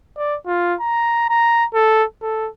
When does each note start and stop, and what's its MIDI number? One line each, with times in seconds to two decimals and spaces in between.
0.17 0.36 74
0.47 0.75 65
0.80 1.26 82
1.29 1.65 82
1.74 2.04 69
2.22 2.49 69